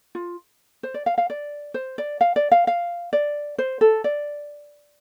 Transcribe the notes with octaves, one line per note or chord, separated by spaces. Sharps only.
F4
C5
D5
F5
F5
D5
C5
D5
F5
D5
F5
F5
D5
C5
A4
D5